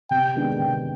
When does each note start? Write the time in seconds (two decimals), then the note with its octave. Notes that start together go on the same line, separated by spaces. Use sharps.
0.10 C3 G5
0.35 D#3 G#3 B3 D4
0.59 C3 G5